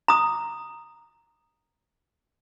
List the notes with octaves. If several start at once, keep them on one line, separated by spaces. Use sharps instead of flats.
A#5 D#6